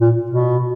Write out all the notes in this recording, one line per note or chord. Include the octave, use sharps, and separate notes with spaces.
A#2
B2